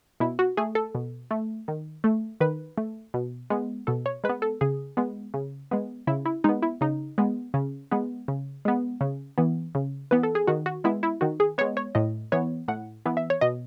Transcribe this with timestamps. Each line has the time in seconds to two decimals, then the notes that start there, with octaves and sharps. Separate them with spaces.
0.20 B2 E4
0.39 F#4
0.57 A3 G#4
0.75 A4
0.95 B2
1.31 A3
1.68 D#3
2.04 A3
2.41 D#3 B4
2.78 A3
3.14 B2
3.50 G#3 B3
3.87 B2 A4
4.06 C#5
4.24 G#3 B4
4.29 B3
4.42 A4
4.61 C#3 G#4
4.97 G#3 B3
5.34 C#3
5.71 G#3 B3
6.07 C#3 E4
6.26 E4
6.44 G#3 B3 D#4
6.63 E4
6.81 C#3 D#4
7.18 G#3 B3
7.54 C#3
7.91 G#3 B3
8.28 C#3
8.65 G#3 B3
9.01 C#3
9.38 E3 B3
9.75 C#3
10.11 E3 B3 B4
10.23 A4
10.35 G#4
10.47 D#3 F#4
10.66 F#4
10.84 G#3 B3 E4
11.03 E4
11.21 D#3 F#4
11.40 G#4
11.58 G#3 B3 C#5
11.77 C#5
11.95 A2 D#5
12.32 E3 B3 C#5
12.68 A2 F#5
13.06 E3 B3
13.17 E5
13.30 C#5
13.41 B2 D#5